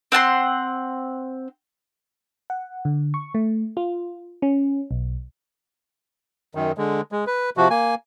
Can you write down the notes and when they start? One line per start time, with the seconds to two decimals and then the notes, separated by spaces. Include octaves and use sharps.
0.12 C4 F#5 A5 C6
2.50 F#5
2.85 D3
3.14 C#6
3.34 A3
3.77 F4
4.42 C#4
4.91 B1
6.55 F#2 D#3
6.78 D3 G#3
7.12 G#3
7.27 B4
7.57 C3 F3 F#4
7.70 A#3 G#5